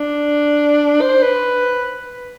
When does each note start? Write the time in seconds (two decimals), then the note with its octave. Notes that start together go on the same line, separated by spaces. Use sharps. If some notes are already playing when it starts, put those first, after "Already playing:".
Already playing: D4
1.01 C5
1.22 B4